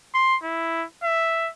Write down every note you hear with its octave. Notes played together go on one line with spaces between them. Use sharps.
C6
E4
E5